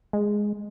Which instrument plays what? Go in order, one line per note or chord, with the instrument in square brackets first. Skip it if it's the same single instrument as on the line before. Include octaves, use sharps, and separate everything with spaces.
[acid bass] G#3